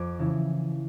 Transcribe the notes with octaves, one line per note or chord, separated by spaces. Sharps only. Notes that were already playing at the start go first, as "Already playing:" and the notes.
Already playing: F2 D6
C#3 E3